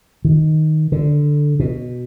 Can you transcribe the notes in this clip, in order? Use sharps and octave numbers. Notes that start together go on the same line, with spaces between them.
D#3
D3
B2